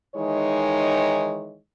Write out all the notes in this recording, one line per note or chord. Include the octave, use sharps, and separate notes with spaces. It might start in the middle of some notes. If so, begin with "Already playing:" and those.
D#3 E3 G#3 D#4 C#5